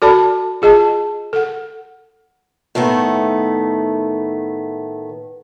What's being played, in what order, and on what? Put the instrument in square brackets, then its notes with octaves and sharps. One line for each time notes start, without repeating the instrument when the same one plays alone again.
[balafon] F#4 A4 D5 A5 B5
F4 G#4 D#5 A5
A4 F#5
[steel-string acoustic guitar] A2 D#3 A3 B3